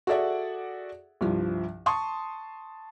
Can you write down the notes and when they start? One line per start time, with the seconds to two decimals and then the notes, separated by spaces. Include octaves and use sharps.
0.07 F#4 G#4 A4 D5 E5 F#5
1.21 C2 G2 F3
1.86 A5 C6 C#6 D#6